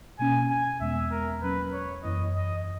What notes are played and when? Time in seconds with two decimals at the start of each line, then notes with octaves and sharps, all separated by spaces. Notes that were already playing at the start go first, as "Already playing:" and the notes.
0.19 B2 A#3 C#4 G#5
0.49 G#5
0.80 E2 B2 G#3 B3 E5
1.11 A#4
1.42 F#3 A#3 C#4 B4
1.73 C#5
2.03 F#2 E3 A#3 E4 D#5
2.34 D#5